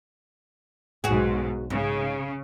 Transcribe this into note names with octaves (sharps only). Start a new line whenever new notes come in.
B1 G#2 F#4 G#4
G#2 C#3